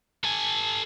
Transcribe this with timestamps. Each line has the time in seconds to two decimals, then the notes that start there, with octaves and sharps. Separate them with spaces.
0.24 A4 G#5